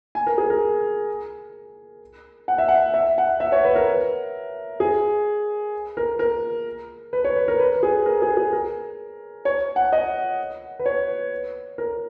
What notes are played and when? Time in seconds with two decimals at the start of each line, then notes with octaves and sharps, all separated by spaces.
0.15 G#5
0.27 A#4
0.38 G#4
0.50 A#4
2.48 F#5
2.58 E5
2.68 F#5
2.94 E5
3.18 F#5
3.40 E5
3.52 C#5
3.65 B4
3.75 A#4
4.80 G#4
5.97 A#4
6.19 A#4
7.13 B4
7.24 C#5
7.36 B4
7.48 A#4
7.60 B4
7.83 G#4
8.06 A#4
8.22 G#4
8.37 G#4
8.53 A#4
9.45 C#5
9.76 F#5
9.92 D#5
10.79 B4
10.86 C#5
11.78 A#4